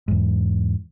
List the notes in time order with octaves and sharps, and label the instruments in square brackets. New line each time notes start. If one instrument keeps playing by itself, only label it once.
[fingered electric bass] E2 G#2